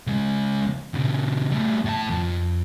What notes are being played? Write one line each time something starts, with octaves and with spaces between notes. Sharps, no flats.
C#2 G#3
A#2 C#3
G3 A3
A2 A5
F2